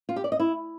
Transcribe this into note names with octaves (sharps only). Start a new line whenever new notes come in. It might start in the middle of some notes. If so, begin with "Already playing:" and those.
F4
G4
D5
D#5
E4